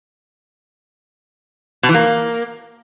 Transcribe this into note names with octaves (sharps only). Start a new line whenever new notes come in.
B2
E3
A#3